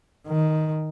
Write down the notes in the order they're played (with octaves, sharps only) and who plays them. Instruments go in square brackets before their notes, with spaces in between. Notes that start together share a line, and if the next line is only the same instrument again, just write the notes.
[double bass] D#3